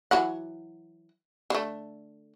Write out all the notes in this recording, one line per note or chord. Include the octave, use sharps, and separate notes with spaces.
E3 F#3 F#5
D3 A3